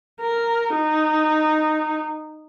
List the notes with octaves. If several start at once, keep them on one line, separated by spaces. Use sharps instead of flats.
A#4
D#4